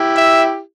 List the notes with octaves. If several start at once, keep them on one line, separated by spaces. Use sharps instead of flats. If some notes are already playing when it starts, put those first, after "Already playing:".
Already playing: E4 G4
E5